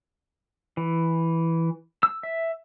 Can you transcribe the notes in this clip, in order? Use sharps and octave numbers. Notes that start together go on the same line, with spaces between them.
E3
E6
E5